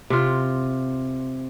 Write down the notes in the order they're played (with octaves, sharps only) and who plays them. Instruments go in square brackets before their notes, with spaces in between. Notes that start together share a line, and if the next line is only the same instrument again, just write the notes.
[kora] C3 F4